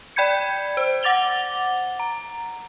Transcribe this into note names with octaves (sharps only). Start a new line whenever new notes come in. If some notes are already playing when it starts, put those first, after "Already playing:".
D5 G5 B5 G6 G#6 C#7
C5
F#5 D6 A6 F7 G7
A#5